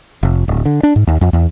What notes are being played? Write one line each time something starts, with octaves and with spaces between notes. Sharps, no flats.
F1
D1
D3
D4
G#2
D#2
F2
E2